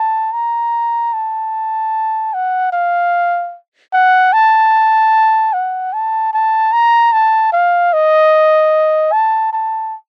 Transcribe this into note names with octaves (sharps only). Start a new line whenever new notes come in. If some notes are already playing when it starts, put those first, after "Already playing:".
Already playing: A5
A#5
A5
F#5
F5
F#5
A5
F#5
A5
A5
A#5
A5
F5
D#5
A5
A5